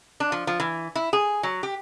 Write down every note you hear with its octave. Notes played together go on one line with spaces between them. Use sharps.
D4
F3
F3
E3
E4
G#4
F#3
G4